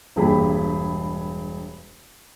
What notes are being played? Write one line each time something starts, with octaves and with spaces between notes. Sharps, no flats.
E1 G2 A#3 G4 G#4 B5